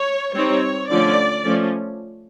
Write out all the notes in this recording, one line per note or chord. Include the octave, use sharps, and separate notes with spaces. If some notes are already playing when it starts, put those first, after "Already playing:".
Already playing: C#5
G3 C4 D#4 C#5
D3 F3 A3 C#4 D5
F3 A3 C#4